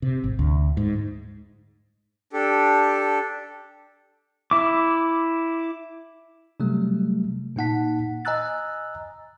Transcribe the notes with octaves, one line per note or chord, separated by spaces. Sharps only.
C3
G#1
D2
G#2
D4 G4 A4
E4 D6
C3 F#3 G3 A3
A#2 A#3 D#4 F#5 A5 B6
D#5 G#5 A#5 E6 F#6 A6